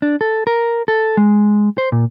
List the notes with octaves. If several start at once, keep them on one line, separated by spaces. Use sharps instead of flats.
D4
A4
A#4
A4
G#3
C5
A#2